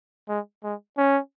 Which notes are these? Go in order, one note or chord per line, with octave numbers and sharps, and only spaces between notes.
G#3
G#3
C#4